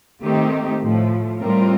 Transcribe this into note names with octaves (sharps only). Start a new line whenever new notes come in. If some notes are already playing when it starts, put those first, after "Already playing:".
D#3 A3 C4 D#4 G4
A2 F3 A3
A2 G3 C4 F4 A#4